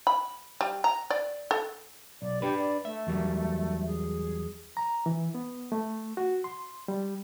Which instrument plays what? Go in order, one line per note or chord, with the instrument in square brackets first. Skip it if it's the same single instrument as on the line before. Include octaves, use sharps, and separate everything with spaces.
[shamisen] B5
G3
A#5
D5
A4
[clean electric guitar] B1 [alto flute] D5
[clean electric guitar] D4 B4 [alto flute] G4
[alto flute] D5
[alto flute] A3 [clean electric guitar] E5
[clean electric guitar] E2 F#3 G3
[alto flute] G#4
[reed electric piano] A#5
E3
B3
A3
F#4
C6
G3